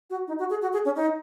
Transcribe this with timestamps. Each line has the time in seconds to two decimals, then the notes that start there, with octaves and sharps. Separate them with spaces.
0.10 F#4
0.28 D#4
0.39 F#4
0.50 G#4
0.62 F#4
0.73 G#4
0.85 C#4
0.96 D#4